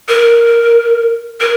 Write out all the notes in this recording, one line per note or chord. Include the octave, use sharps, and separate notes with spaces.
A#4
A#4